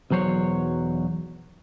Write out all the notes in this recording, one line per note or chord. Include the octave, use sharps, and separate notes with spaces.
B1 E2 F#3 C5 C#5